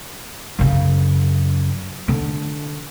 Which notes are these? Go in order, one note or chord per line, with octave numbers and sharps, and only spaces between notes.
F#2 C#3
D3 D4